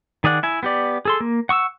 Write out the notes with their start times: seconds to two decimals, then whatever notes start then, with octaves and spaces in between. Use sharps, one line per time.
0.24 D#3 G#4 D5 F#5
0.43 E4 G#5
0.63 B3 G4 D5
1.05 G#4 A4 C6
1.20 A#3
1.49 F#5 C#6 D#6 E6